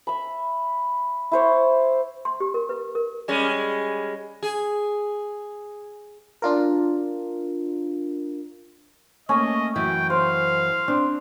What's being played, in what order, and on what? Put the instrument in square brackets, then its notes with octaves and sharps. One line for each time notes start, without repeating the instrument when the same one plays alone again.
[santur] E5 B5
E4 C5 C#5
[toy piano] C6
G4
A#4
B4
A#4
[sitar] G3 G#3 C#4
G#4
[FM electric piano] D4 F4 A#4
[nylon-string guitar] A3 A#3 [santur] C#4 [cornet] D#5
[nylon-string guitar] F#2 E3 E4 [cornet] G5
[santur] C5 [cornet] F5
[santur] C4 [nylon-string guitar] D4